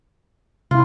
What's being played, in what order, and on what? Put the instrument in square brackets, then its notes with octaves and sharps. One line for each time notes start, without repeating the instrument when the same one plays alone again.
[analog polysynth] C3 E4 [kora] F4